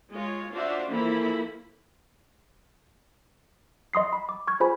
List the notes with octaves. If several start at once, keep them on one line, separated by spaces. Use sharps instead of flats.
G#3 F4 C#5
D4 F4 F#4 C5 E5 F5
E3 F3 A#3 E4 A4 B5
D#5 C6 D#6 C7
B5
D6
C#6 F6 G#6
F4 G#4 C5 G#5 B5